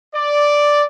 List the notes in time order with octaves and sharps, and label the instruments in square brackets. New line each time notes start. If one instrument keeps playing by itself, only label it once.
[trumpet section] D5